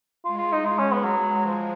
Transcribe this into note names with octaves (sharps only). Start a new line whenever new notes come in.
G#3 F4
F4
D#4
F4
C#4
B3
F#3
F3